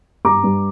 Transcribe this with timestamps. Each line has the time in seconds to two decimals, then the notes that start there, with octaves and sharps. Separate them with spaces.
0.25 G2 A#5 D6
0.44 G2